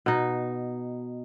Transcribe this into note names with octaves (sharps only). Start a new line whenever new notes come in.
B2 D#4